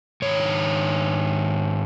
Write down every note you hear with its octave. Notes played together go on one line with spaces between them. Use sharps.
G#2 D#3 C#5